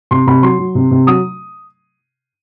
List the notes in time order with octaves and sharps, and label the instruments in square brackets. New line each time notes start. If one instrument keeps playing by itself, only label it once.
[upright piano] C3 C6
C3 B5
F#3 C6
F#3
C3
C3
F#3 D#6